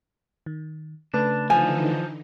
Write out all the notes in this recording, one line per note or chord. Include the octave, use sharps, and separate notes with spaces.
D#3
C#3 A3 D4 B4
D3 E3 F3 D#4 G#5